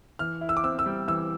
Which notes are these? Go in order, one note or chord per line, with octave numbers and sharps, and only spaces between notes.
E3 F6
E4
E6
D6
C4 E6
E6
G3
E3 E6